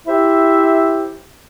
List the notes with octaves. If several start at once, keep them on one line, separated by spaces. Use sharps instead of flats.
E4 G4 C5 E5